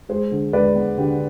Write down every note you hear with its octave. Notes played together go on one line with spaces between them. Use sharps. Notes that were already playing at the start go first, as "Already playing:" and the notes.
G#3 G#4 C5
D3
G#3 B4 D5
B3
D3 G4